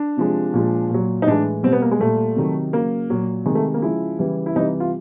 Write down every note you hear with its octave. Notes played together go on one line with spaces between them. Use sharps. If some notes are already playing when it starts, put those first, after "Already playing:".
Already playing: D4
C3 F3 G#3
A#2 F3 G#3
A#2 F#3
D#4
A2 E3 G#3 D4
B2 G3 C4
B3
A#3
G#3
A#2 G3 A3
C3 D#3 F#3
C#3 F#3 A#3
A#2 F#3
C3 D#3 G#3
A3
A#3
C#3 F3 G#3 E4
C#3 E3 G3
E4
C3 E3 G3 D#4
F4